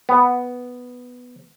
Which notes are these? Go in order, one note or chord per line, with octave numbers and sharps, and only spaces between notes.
B3